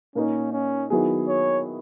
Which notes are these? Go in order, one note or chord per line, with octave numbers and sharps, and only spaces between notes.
A#2 A#3 C#4 D#4 A#4
C#4
D#3 F#3 B3 E4 G#4
C#5